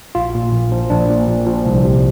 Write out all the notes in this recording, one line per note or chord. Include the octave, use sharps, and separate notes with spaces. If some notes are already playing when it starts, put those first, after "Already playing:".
A#1 F4
A#2
A#1
F3
A#1 D4
A#2
A#1
F3
C2
C3